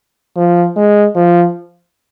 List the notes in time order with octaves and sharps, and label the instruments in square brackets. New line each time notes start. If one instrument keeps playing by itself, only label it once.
[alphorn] F3
G#3
F3